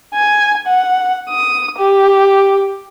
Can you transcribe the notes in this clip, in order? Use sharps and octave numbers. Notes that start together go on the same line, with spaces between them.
G#5
F#5
D#6
G4